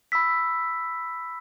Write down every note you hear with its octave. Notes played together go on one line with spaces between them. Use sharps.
B5 E6 B6